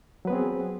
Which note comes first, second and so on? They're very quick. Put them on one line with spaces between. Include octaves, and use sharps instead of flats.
F#3 B4 B3 C4 G#4